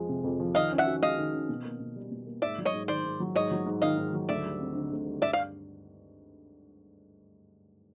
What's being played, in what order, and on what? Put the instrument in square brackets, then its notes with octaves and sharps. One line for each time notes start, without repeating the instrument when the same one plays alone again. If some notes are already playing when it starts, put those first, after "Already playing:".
Already playing: [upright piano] F2 F3 G#3
C3
F2
F3
[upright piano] D#3 [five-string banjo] D#5 F5
[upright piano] C#4
[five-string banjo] E5 F#5
[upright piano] F#4
[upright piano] G#3 [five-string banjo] D#5 F5
[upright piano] D#3
C#4
B2
A#3
B2
G3
B2
A#3
[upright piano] G#2 [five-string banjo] D5 E5
[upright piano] F#3
[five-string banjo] C#5 D#5
[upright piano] G#2
[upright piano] D#3 [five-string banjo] C5 D5
[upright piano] G#2
F#3
[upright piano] G#2 [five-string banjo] C#5 D#5
[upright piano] F#3
G#2
[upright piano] D#3 [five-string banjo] D#5 F5
[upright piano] G#2
F#3
[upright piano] D2 [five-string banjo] D5 E5
[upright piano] G3
C4
D3
D2
G3
[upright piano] G2 [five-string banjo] D5 E5
[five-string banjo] F5